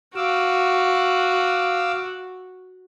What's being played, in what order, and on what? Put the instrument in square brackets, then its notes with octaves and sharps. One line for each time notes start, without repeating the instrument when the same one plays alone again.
[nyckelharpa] F#4 [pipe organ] F5 D6 E6